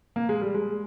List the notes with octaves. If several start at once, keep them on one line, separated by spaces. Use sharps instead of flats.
A#3
G#3
G3
G#3